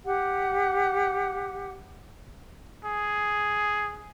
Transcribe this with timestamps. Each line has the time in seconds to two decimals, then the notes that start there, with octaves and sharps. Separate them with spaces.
0.06 G4 F#5
2.85 G#4